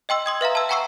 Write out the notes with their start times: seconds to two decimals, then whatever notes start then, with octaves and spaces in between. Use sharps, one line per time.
0.09 D#5 G5 C6 E6
0.26 C6 D#6 G#6
0.41 B4 E5 F5 A#5
0.55 A5 E6
0.69 F#5 G#5 A#5 C#6 E6 C7